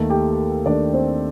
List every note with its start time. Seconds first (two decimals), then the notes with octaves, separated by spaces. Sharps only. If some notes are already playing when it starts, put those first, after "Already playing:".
Already playing: D#2 D#3 A3 A4 A5
0.10 G4 G5
0.66 D#2 D#3 A3 D4 D5
0.93 C4 C5